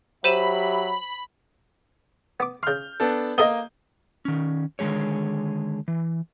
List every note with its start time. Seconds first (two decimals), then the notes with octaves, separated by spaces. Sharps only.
0.24 F#3 G4 C5 E5 B5 D#7 E7
2.40 B3 D6
2.63 C#3 C6 F6 G6
3.00 B3 D4 A4
3.38 A#3 B3 A4 D#5 D#6 G7
4.25 D#3 C#4
4.79 D3 D#3 G#3 G#4 C#5
5.88 E3